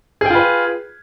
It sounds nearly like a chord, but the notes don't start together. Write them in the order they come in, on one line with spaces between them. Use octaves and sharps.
G#4 G5 F4 B4